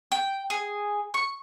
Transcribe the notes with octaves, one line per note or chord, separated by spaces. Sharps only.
G5
G#4
C#6